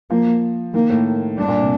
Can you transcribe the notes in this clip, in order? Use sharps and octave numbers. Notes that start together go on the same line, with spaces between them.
F3 A#3
D#3 A#3
A2
G2 D4
A#2
C3